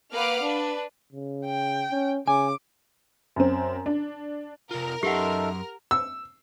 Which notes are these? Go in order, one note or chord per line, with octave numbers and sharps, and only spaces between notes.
A#3 B4 F5 F#5 D6 F6
D4 B4
C#3
G5
C#4
C#3 G#5 D6
F#2 C4
D4
C3 F4 A#4 F6
F#2 D#4 G4 A4 E5 F#5 C6
E6